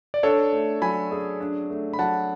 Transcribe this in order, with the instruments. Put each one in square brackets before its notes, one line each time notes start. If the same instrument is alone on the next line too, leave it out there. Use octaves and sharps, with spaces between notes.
[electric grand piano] D5
[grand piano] D4 [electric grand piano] A4 C#5
[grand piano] A3
[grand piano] F#3 [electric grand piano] G#5 B5
[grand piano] G#4
D4
A3
[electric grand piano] B5
[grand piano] F#3 [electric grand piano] F#5 A5